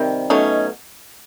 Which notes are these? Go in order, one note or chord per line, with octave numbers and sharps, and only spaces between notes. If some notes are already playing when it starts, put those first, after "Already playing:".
Already playing: C3 D#3 G3
B2 F#3 A3 C#4 D#4